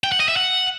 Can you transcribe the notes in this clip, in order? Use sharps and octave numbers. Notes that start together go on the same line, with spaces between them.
G5
F#5
D#5
E5
F#5